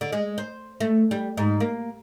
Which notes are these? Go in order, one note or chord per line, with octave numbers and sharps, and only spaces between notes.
D3
G#3
C5
A3
G3
G#2
A#3